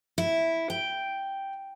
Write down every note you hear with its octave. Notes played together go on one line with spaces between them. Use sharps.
E4
G5